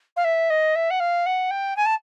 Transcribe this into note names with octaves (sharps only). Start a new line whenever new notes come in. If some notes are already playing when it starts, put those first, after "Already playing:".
F5
E5
D#5
E5
F#5
F5
F#5
G5
G#5
A5